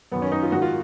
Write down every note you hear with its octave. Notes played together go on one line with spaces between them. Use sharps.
F#2 D#3 B3
C#4
D#4
F4
G#2 D#3 F#4
F4